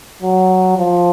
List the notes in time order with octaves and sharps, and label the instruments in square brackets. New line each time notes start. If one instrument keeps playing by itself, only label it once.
[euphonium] F#3
F3